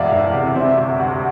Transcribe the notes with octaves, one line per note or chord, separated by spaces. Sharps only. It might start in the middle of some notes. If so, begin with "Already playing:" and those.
Already playing: E1 E2 E3 D5 E5 F5
E1
C3
C3 C5 E5
D2
D2